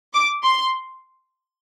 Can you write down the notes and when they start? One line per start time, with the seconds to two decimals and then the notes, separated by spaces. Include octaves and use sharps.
0.14 D6
0.44 C6